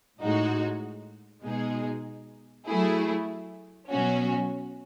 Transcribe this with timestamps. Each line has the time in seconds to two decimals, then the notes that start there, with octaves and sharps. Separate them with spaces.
0.20 A2 G#3 D#4 F#4
1.43 B2 G#3 D#4 G#4
2.67 F#3 A3 E4 G#4
3.90 B2 F#3 C#4 F#4